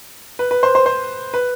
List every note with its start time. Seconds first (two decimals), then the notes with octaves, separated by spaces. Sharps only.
0.39 B4
0.51 B4
0.63 C5
0.75 C5
0.86 C5
1.34 B4